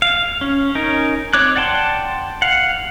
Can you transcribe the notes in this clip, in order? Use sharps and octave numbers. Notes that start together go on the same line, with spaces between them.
F5
C#4
C#4 D#4 A#4
C4 C#5 D6 F#6
D5 F#5 G5 A5 C6
F5 F#5